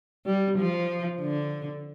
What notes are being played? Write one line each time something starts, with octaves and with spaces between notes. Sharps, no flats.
G3
F3
D3